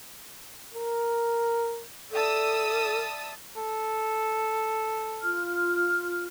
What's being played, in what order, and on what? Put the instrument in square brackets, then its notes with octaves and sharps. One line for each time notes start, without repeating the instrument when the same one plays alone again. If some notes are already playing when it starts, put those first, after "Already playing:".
[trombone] A#4
[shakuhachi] A4 [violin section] D5 D#6 E6 [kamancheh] E5 A5
[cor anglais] A4
[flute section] F4 F6